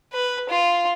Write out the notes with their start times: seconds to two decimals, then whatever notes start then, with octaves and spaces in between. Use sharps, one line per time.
0.13 B4
0.50 F4